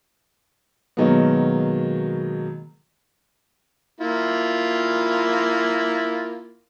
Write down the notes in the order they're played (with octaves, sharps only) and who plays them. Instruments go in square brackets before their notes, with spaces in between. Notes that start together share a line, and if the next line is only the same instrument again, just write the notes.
[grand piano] B2 D#3 F#3 G#3 A#3 B3
[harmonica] A#3 E4 F4